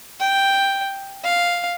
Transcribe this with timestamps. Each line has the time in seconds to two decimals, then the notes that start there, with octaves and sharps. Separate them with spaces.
0.21 G5
1.24 F5